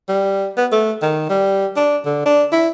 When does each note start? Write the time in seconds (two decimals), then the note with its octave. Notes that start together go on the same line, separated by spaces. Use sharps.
0.08 G3
0.57 B3
0.72 A3
1.02 D#3
1.29 G3
1.76 D4
2.05 D3
2.25 D4
2.52 E4